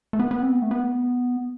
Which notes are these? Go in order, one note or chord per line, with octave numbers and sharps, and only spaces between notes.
A3
B3
B3
C4
B3
A3
B3